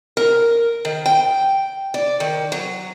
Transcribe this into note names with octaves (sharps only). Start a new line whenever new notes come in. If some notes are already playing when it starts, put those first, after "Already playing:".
A#4
D#3
G5
D5
D#3
F#3